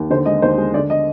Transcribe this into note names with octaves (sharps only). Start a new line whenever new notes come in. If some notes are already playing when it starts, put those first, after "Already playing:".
Already playing: D#2
D3 C5
G#3 D#5
D#2 C5
G#3
D3 D5
D#5